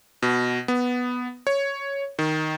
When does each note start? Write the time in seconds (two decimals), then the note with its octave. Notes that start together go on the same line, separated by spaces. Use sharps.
0.22 B2
0.68 B3
1.47 C#5
2.19 D#3